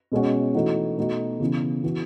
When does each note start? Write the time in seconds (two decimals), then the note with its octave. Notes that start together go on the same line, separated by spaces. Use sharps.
0.12 B2 G#3 C#4 F#4
0.55 E3 A3 D#4 F#4
0.98 B2 A3 D#4 F#4
1.40 C#3 E3 B3
1.84 E3 B3 F#4